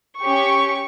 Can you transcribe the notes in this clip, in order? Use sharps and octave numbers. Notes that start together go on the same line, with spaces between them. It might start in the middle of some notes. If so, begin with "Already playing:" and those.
C#4 G4 C#6